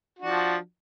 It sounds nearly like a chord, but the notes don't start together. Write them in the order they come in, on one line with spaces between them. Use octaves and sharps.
F#4 D4 F3